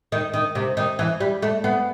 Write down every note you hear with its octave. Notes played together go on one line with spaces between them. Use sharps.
D#3
D#3
C3
D#3
E3
G3
A3
B3